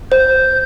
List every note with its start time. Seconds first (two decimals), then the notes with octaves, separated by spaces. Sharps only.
0.11 C5 G6